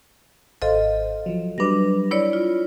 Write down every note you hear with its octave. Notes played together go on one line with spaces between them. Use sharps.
G#1 A4 C5 D#5 F5
F3 F#3
F#3 G3 D4 B4 A#6
E4 C#5 D5 B5
F4